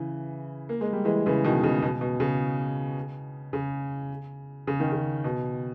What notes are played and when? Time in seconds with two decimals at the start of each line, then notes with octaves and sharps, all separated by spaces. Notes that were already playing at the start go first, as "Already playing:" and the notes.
Already playing: C#3 E3
0.69 A#3
0.81 G#3
0.93 G3
1.05 E3 G#3
1.26 C#3 E3
1.44 B2 D#3
1.63 C#3
1.82 B2
2.01 B2
2.20 C#3
3.53 C#3
4.67 C#3
4.80 D#3
4.92 C#3
5.24 B2